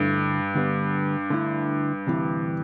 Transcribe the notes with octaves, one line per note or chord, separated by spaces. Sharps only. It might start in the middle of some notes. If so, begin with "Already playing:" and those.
Already playing: D2 G2 D3 A3 E4
D2 D3 G3 B3
D3 A3 E4
D2 C3 E3